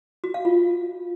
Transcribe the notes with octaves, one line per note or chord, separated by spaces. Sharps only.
F#4
F5
F4